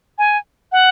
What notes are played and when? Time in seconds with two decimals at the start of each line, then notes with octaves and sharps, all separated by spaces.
0.18 G#5
0.72 F#5